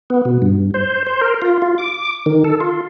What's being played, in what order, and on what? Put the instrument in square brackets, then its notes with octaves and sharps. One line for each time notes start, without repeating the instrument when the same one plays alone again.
[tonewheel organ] B3
B2
G2
C5
C5
A#4
F4
F4
D6
D#3
A4
F4